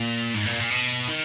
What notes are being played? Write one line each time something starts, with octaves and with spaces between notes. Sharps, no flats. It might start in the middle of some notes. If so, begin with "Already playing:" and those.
Already playing: A#2
G#2
A#2
A#2
B2
D#3